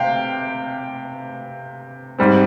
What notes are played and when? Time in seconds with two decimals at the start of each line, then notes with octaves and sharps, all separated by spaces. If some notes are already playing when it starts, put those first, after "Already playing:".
Already playing: C3 F5 G5
2.19 G#2 G3 C4